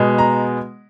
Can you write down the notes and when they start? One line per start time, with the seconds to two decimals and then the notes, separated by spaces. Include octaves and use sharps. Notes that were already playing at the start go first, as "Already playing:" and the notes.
Already playing: B2 G#3 B3
0.18 A#5